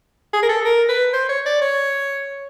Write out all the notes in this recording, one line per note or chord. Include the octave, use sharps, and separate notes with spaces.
G#4
A#4
A4
A#4
B4
C5
C#5
D5
C#5